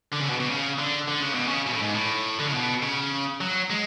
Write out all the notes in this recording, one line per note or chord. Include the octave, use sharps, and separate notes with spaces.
D3
C#3
B2
B2
C#3
D3
D3
C#3
B2
C#3
B2
A2
G#2
A2
D3
C#3
B2
C#3
F#3
G#3